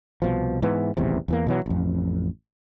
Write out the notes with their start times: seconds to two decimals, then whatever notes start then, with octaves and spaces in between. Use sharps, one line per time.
0.22 C2 B2 F3
0.62 G#2 E3 B3
0.97 D#1 A1 E2 C3
1.28 E2 E3 A#3
1.47 B2 E3 F#3
1.66 A1 F2